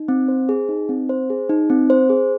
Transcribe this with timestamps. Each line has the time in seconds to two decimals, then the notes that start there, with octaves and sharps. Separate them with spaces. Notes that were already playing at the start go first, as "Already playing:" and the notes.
Already playing: D#4
0.08 C4
0.28 C5
0.49 G#4
0.69 D#4
0.89 C4
1.09 C5
1.30 G#4
1.49 D#4
1.70 C4
1.90 C5
2.09 G#4